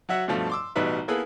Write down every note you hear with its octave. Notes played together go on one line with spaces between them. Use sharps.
F#3 F#4 E5 F#5
G2 B2 F3 A3
C6 D6 E6
A1 B2 G3 D#4 B4 E5
A#3 B3 E4 G#4 A4 B4